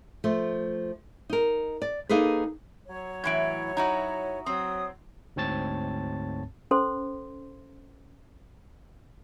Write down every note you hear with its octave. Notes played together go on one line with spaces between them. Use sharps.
F3 A3
D#4 A#4
D5
A#3 D#4 G#4 A4 B4
F#3 C#5
A2 E3 E4 G#6 D7
D#4 E4 F#4 A#5
F#3 C4 D#6
D2 G#2 C4 C#5 A5 A6
C#4 A4 C5 C6